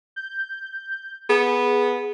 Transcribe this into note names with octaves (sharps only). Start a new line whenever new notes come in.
G6
B3 G#4